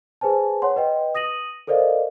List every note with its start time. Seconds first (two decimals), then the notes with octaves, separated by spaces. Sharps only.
0.21 G#4 B4 C5 G#5 A5
0.62 C#5 F#5 C6
0.76 B4 D#5 G5
1.15 D#6 A#6 D#7 F#7
1.67 A4 A#4 C5 D5 D#5 F5